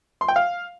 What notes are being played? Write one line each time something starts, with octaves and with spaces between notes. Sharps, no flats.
C6
G5
F5